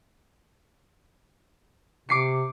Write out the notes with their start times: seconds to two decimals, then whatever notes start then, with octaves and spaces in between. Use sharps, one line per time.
2.09 C3 D6 C7 C#7